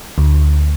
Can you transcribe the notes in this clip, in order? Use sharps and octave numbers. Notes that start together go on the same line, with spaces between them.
D2